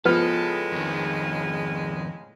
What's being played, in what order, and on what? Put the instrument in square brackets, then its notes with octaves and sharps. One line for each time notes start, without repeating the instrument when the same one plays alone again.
[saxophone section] A2 C#3 G#3 [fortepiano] F3 B3 F6 [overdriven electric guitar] A4
[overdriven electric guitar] F2 D#3